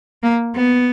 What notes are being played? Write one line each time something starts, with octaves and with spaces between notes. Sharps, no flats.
A#3
B3